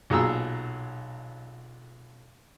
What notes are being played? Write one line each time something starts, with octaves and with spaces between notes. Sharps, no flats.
B1 A#2 F#3 G#4 A#5 E6